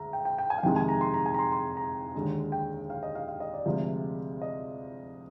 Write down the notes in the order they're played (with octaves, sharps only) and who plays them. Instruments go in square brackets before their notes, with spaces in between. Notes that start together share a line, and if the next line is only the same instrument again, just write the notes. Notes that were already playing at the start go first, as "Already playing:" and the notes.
Already playing: [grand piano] D2 G#3 A#5
G5
G5
G5
G#5
F5
F2 C3 D#3 G#3 G5
G#5
A#5
C6
A#5
G#5
A#5
C6
C6
A#5
D#2 D3 G#3
G5
F5
D#5
F5
F5
D#5
D5
D2 C3 F3 G#3
D#5